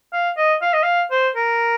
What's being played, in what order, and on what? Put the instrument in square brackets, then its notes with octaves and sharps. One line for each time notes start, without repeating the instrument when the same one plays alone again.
[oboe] F5
D#5
F5
D#5
F5
C5
A#4